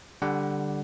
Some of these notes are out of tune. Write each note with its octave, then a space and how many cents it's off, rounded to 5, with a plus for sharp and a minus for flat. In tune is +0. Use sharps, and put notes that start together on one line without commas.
D3 +0 G3 +0 F#5 +15